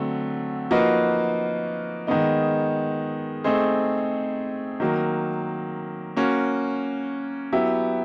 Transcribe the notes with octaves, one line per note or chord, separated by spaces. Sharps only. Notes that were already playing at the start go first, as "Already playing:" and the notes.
Already playing: D3 F#3 A3 C4
F3 A#3 D#4 F#4 B4
D#3 G#3 B3 D#4
A3 C4 D#4 G#4 C5
D#3 F#3 A#3
A#3 C#4 F#4
F#3 B3 E4 G4